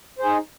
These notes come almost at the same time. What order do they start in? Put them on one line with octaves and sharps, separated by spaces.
C5 G#4 D#4